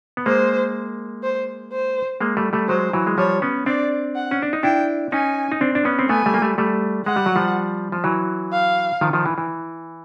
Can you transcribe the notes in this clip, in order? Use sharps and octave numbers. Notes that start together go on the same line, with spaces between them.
B3
G#3 A#3 C5
C5
C5
G#3 A#3
G3 A3
G3 A3
F#3 G#3 C5
E3 F#3
G#3
F3 G3 C#5
B3 C#4
C4 D4 D5
F#5
C#4
D4
D#4
D4 E4 G5
C#4 D#4 G#5
D#4
C4 D4
D4
B3 C#4
C4
A3 B3 G#5
G3 A3
A#3
G3 A3
G3 A3
G#3 F#5
G3
F#3
F3 G3
F3
E3 F#3
F5
D#3 F3
D#3 F3
E3
E3